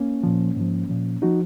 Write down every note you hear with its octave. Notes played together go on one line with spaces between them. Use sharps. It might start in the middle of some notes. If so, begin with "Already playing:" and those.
Already playing: A#3 C#4
A#2 F3
G#2 F3
A#2 F3
F3 D#4 F#4